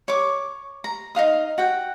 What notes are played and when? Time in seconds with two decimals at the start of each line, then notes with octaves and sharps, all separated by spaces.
0.08 C#5 C#6 D6
0.84 A#5
1.15 D#4 E4 F5 D#6
1.58 F#4 F#5 G5